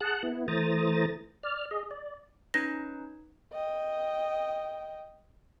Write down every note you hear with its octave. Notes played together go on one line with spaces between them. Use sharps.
G#4 F#5 A5 F#6
B3 E4
E3 A3 C5 A#5 D#6 A6
D5 F6
G#4 D#5
D5
C#4 D#4 B4 A#6
D#5 G5